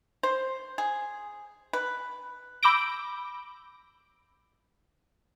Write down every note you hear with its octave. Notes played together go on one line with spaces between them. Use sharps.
C5
G#4
B4
B5 D6 E6 G6 A#6 D7